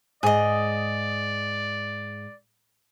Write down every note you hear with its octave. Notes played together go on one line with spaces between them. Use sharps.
G#2 G#4 D5 D#5